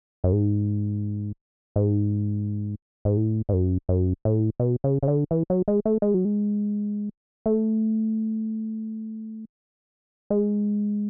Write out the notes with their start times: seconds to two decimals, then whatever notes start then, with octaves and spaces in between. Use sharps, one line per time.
0.24 F#2
0.33 G#2
1.76 G#2
3.05 G#2
3.17 A2
3.49 G#2
3.53 F#2
3.89 F#2
4.25 A2
4.60 B2
4.84 C#3
5.03 C#3
5.08 D3
5.31 E3
5.50 F#3
5.68 G#3
5.85 A3
6.02 G#3
6.14 F#3
6.25 G#3
7.46 A3
10.30 G#3